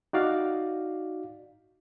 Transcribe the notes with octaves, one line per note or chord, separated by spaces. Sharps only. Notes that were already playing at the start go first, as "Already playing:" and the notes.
D#4 F#4 D5 F5